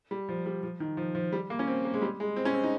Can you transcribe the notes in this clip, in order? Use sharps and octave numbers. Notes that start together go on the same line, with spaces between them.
G3
F3
G3
F3
D#3
F3
F3
G3
A#3
C#4
C4
A#3
G#3
G3
G#3
C4
C#4
C4
D#4